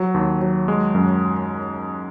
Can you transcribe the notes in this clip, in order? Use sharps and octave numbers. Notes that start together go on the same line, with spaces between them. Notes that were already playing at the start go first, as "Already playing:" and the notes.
Already playing: F#3
D#2
F#3
G#3
F#2